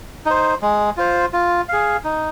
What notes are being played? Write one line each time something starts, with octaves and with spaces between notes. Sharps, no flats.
D#4 C5
G#3
F4 C5
F4
G#4 F5
D#4